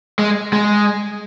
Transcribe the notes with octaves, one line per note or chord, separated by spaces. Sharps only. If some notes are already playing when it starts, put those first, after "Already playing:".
G#3
G#3